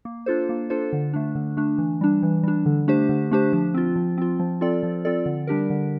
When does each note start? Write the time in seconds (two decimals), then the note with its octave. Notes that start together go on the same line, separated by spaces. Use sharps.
0.05 A#3
0.26 D4 F4 A4 C5
0.49 A#3
0.70 D4 F4 A4 C5
0.93 D3
1.14 A3 D4
1.35 D3
1.57 A3 D4
1.78 E3
2.01 G3 D4
2.23 E3
2.43 G3 D4
2.66 D3
2.88 A3 D4 G4 C5
3.09 D3
3.31 A3 D4 G4 C5
3.53 F3
3.74 C4 F4
3.96 F3
4.18 C4 F4
4.39 F3
4.61 C4 F4 A4 D5
4.83 F3
5.05 C4 F4 A4 D5
5.26 D3
5.47 G3 D4 G4 A#4
5.70 D3